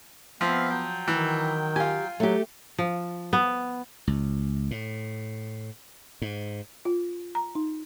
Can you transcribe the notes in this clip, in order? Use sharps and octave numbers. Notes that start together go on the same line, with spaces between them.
F3 B3 C4 E5 F5
F#3 G5
D#3 E3
F4 G4 G#5
F#3 A3 G4
F3
B3
C#2
A2
G#2
F4
A#5
D#4